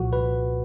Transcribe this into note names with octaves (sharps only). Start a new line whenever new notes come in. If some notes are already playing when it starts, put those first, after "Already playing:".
Already playing: C2 A#2 F3 F#4
B4